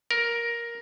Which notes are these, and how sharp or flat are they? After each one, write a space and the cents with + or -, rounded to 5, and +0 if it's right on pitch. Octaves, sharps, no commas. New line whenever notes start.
A#4 +10